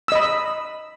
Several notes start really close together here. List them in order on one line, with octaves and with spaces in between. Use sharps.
E6 D#5 B5